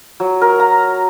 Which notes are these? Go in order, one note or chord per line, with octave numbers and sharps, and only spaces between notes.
F#3
A#4
A#5